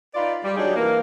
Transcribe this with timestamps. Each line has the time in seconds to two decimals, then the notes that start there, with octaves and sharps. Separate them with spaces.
0.15 D#4 F4 B4 D5
0.44 G3
0.56 F#3 D4 D#4 G4 G#4
0.76 E3 A#3